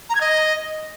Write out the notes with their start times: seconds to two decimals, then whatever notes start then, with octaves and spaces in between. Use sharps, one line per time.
0.09 A#5
0.15 G#6
0.21 D#5